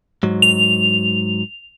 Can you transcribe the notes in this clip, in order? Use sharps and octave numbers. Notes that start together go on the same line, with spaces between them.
G#2 F#3
F7